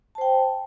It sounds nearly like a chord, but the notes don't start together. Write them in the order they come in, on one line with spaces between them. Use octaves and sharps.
A5 C5 G5